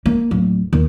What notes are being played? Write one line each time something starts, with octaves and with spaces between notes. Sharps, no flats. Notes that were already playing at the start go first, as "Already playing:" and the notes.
A#3
D1
D#2